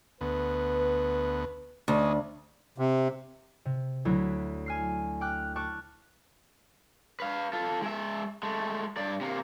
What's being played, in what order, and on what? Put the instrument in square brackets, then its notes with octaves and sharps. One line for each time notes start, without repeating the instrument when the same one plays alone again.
[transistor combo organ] D2 B3 [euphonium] B4
[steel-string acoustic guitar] D2 [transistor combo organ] C#4 D4 D#5
[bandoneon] C3
[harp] C3
D2 F#3 E4 C#5
G#5 F6 C7
G5 D6 F6 F#6
A5 C#6 D6 F6 F#6
[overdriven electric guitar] B4 F5
F4 A4
G#3 E5
G#3 A3
G2 D5
C3 A#3